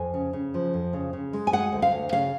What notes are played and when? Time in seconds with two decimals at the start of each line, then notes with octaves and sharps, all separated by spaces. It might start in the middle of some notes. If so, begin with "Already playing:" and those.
Already playing: F2 G#5
0.14 C#3
0.33 C#3
0.54 F3
0.74 F2
0.93 C#3
1.13 C#3
1.33 G#3
1.47 G#5
1.53 G#3 F#5
1.72 D2
1.82 F5
1.91 D2
2.12 C#3 F5